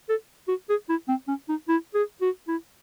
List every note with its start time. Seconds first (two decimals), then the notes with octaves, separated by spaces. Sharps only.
0.09 A4
0.48 F#4
0.69 G#4
0.89 E4
1.08 C4
1.28 C#4
1.49 D#4
1.68 E4
1.95 G#4
2.22 F#4
2.48 E4